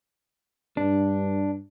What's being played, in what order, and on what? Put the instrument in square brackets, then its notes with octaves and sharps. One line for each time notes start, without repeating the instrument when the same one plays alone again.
[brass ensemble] G2 [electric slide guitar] D4